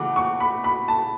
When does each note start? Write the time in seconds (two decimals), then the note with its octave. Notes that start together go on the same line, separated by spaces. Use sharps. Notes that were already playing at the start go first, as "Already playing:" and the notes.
Already playing: C#3 E3 F#5 D6
0.16 C#6
0.40 B5
0.64 B5
0.88 A5